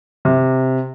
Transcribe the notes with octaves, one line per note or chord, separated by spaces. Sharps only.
C3